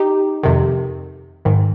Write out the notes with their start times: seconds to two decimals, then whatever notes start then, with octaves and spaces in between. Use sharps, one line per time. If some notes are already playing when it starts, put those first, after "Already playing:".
Already playing: D#4 G4
0.43 F2 C3 D#3
1.45 G#2 D#3